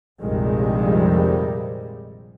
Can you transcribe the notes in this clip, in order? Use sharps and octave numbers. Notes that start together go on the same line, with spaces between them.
A#1 F2 C3 D#3 G3 G#3